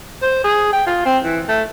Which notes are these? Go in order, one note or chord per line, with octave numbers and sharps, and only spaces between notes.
C5
G#4
G5
F4
C4
E3
A3